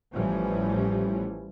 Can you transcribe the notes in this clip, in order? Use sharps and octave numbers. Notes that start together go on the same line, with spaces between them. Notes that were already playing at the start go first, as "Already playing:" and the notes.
A1 E3 F3 G3 C#4